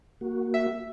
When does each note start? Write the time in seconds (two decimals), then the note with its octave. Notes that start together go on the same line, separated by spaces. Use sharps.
0.21 A#3 F#4
0.54 E5